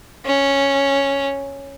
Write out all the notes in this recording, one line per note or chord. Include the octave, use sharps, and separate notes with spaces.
C#4